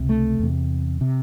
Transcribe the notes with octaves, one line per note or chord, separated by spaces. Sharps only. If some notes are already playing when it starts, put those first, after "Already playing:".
Already playing: C#2 C3
A3
E2 C3
C3